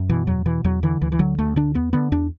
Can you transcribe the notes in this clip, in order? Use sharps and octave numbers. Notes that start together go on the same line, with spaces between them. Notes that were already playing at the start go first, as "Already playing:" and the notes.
Already playing: F#2
B2 E3
E2 F#3
B2 E3
E2 F#3
D3 E3
D2 E3
E3
D3 F#3
D2 A3
D3 D4
E2 B3
D3 B3
E2 D4